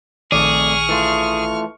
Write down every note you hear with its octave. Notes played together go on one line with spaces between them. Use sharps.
A#1 F2 D#3 A3 G#4 D5 C#6 F6
E3 A3 F4